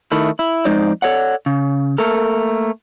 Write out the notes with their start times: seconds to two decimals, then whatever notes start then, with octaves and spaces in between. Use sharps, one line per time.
0.12 D#3 A3 E4
0.39 E4
0.65 F2 G#3 D#4 C5 D5
1.02 A4 C#5 D5 F#5
1.46 C#3
1.98 A3 A#3 A4 A#4